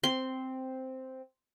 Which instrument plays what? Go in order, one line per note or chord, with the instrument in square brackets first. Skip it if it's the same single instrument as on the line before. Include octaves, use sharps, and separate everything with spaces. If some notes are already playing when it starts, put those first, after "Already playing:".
[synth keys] C4 [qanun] C6